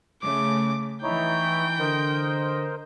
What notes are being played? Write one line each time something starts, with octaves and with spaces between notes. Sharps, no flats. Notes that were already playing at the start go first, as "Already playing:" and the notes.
C#3 A3 D6
E3 D#4 E4 C#5 G5
D3 A#4 C5 D#5